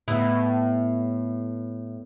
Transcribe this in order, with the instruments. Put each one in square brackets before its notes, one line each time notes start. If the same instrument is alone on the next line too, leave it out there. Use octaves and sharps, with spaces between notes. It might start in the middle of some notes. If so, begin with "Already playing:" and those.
[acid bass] A2 [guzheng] B3 E4